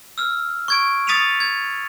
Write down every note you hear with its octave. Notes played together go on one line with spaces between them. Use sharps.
E6 F6
C#6 G#6 D7
D#6 A6 B6 C#7 D#7 F7
G#6